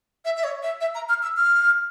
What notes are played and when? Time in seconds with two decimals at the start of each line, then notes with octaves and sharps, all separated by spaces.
0.25 E5
0.37 E5
0.44 C#5
0.63 E5
0.81 E5
0.95 A#5
1.09 F6
1.23 E6
1.37 F6